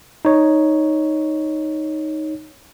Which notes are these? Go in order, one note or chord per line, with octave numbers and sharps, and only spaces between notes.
D#4 C#5